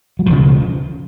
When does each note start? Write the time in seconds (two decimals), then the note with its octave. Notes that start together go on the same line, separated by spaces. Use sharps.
0.19 F#3
0.26 E1 D2 C#3 F3